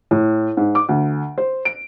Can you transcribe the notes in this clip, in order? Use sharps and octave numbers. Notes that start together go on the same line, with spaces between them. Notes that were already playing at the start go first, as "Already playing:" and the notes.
A2
G#2
D6
D2
C5
D7